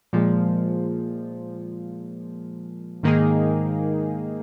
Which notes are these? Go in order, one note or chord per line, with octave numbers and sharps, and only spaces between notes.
A#2 F3 G#3
G#2 D#3 A#3 D#4 G#4